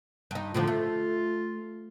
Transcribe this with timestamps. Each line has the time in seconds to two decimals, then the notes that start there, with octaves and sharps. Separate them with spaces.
0.31 G2 D#4
0.54 A2 D3 F3 F4
0.67 A3